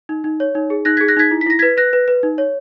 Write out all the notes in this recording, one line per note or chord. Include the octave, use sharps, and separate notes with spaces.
D#4
D#4
C#5
D#4
G#4
D#4 F#6 A#6
G#6 B6
G#4
F#6 A#6
D#4 G#6 B6
E4
B6
E4 A#6
G#6 B6
B4
B4 F#6 A#6
B4
B4
D#4
C#5